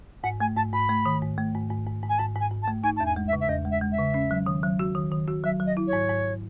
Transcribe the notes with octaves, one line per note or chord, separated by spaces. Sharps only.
G#2 F#5
A3 G#5
G#2 A5
G#2 B5
A3
D#3
G#2
A3
G#2
G#2
G#2
G#2
G#5
G#2 A5
G#2 G#5
G#2
A5
A3
D#4 G#5
E2 A5
G#5
G#3
E5
C#3
E5
E2 D#5
G#3
E5
G#3
E5
C#3
C#4
F#3
D#3
F#3
F#4
D#3
D#3
F#4
F#3 E5
F#3
D#5
E4
C#5
G#2
G#2